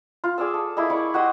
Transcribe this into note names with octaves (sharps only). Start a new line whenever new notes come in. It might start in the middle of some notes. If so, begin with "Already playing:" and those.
F4
G#4 D5 D#6 E6
A4
A#3 E4 G#4 D#5
D5 B5 C#6
F#4 G4 D#5 C6